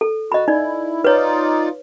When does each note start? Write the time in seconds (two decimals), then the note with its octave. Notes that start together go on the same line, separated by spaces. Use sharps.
0.01 A4
0.32 F#4 D#5 B5
0.48 D#4 E4 D5
1.04 D#4 F4 B4 C#5 D5